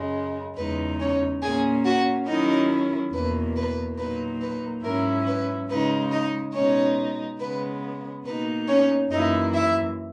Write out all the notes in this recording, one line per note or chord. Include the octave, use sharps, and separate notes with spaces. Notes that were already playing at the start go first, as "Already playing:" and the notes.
Already playing: F#2 C#3 G#3
E2 C#3 G#3 D#4 B4
C#4 C#5
A#2 A#3 C#4 G#4 G#5
F#4 F#5
D#3 F#3 C#4 D#4 E4 D#5
E2 B2 A#3 B4
B4
A#2 F#3 A#3 D#4 B4
B4
G#2 F#3 C#4 E4 A#4
B4
C#3 G#3 D#4 B4
D#4 D#5
B2 G#3 C#4 D#4 C#5
C#3 G#3 B3 B4
B2 A#3 D#4 B4
C#4 C#5
F#2 E3 A#3 D#4 E4 D#5
E4 E5